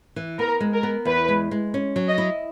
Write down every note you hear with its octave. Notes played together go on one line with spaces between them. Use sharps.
E3
B3 A#4
G#3
A#4
B3
E2 B4
G#3
G#3
C#4
F#3
D#5
E4